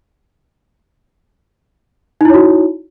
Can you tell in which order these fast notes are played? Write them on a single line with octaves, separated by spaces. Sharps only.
D#4 E4 C#5 F#4